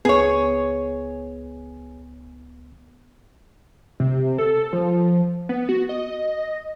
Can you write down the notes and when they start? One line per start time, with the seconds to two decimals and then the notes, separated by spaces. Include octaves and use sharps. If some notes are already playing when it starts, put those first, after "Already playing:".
0.05 C#2 B3 G#4 C#5
4.00 C3
4.38 A4
4.73 F3
5.49 B3
5.69 F#4
5.89 D#5